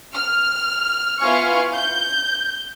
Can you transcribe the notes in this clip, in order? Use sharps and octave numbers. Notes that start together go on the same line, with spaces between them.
F6
B3 E4 F4 G#5 C#6 F6
G6